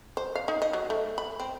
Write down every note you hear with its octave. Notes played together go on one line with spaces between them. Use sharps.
C5
F5
D#4
D#5
F#3
A3
B5
C4